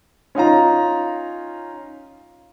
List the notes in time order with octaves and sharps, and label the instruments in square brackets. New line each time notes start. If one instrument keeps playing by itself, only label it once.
[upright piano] C#4 D#4 F4 A#5